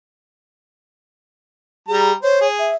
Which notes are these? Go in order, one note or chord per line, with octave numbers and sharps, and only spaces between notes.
G3 G#4 A#5
C5 C#5
G#4
E5